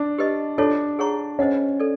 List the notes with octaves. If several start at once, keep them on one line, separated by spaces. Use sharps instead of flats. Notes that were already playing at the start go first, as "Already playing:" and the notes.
Already playing: D4
G4 B4 D#5
D4 F4 A4 C#5
G#4 C#5 F#5 A#5 C#6
C#4 C5 D#5 F#5
A4 D5